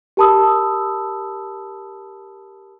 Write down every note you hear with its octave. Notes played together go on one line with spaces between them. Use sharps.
G4 A#4 A5 B5 D#6 E6